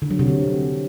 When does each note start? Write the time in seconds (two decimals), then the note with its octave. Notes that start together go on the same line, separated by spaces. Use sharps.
0.02 D3
0.11 F#3
0.19 C3
0.28 D3